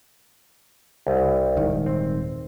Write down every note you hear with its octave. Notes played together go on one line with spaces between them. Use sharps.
C2
D#1 G#2 D#3
C4